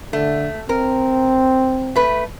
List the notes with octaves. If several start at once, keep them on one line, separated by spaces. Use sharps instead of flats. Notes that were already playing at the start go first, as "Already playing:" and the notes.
D3 A3
C4 A#4
A3 B4